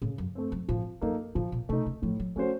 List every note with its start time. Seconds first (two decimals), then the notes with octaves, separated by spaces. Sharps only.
0.02 A2 C#3
0.18 F#2
0.35 A3 C4
0.52 F#2
0.68 A2 F3
1.01 F#2 A#3 D#4 A4
1.35 A2 F3
1.52 A#2
1.69 C3 A3
1.73 D#4
1.86 C#3
2.02 A2 F3
2.20 F#3
2.36 F3 A3 C#4 F#4 C5